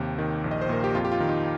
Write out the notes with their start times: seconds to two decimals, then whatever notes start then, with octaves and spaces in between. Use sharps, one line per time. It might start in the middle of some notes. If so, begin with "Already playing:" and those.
Already playing: D#2 C3 G4
0.18 D#3
0.44 A#1
0.51 D#5
0.61 C5
0.69 A#2 A#4
0.84 G4
0.95 F2 F4
1.05 G4
1.12 F4
1.20 D#3
1.29 D#4